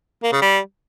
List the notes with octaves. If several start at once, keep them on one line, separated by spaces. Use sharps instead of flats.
A#3
C#3
G3